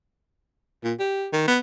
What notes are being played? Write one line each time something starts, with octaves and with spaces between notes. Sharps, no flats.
A#2
G4
D#3
B3